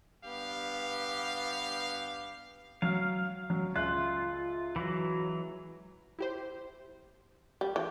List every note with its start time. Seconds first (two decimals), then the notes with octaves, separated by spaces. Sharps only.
0.24 G2 B3 G4 F5
2.82 F#3 F5 F6
3.50 F#3
3.76 C#2 F4 E5 F#6
4.76 E3 F#3
6.19 E4 G4 C5
7.61 G3
7.76 E3 G5